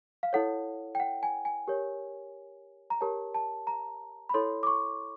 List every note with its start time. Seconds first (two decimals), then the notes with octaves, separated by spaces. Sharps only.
0.23 F5
0.33 E4 A4 C#5 F#5
0.95 G5
1.00 F#5
1.23 G#5
1.45 G#5
1.68 G4 A#4 C#5
2.90 A#5
3.01 G4 A#4 C#5 A5
3.34 A5
3.67 A#5
4.29 B5
4.34 E4 A4 C#5 C6
4.63 D6
4.67 C#6